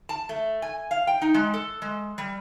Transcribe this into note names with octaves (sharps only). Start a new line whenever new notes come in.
A5
A3
G#5
F5
G5
D#4
G#3
A4
G#3
G3